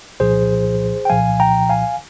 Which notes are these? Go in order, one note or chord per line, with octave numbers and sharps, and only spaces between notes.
C2 A#2 F3 G#4 C5
G5
C2 A#2 F3 F5 G#5
G5 A#5
F5 G#5